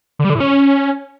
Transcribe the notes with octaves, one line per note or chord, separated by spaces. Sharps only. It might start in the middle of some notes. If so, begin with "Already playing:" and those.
D3
G3
D3
A2
C#4